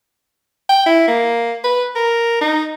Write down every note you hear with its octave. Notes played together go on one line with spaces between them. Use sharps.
G5
E4
A#3
B4
A#4
D#4